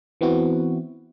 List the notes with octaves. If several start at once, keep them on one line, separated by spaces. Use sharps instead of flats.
E3 B3 C4 E4 F#4